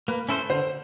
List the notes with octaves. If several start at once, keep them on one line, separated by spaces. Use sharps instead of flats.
A#3 B4
C#4 E4 A4 C5
D3 C5